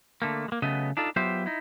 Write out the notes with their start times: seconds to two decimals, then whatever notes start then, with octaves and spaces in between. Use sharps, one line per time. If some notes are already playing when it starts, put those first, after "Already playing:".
0.22 D3 A3 A#3
0.48 G#3 A#3
0.62 C#3 F#3 A3 B3 D#5
0.97 D4 D#4 F4 A4
1.16 F#3 B3 F4 G4 C5 E5
1.46 D#4 E4